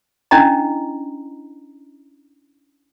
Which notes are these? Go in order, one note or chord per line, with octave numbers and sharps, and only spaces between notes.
C#4 D4 E4 D#5 A#5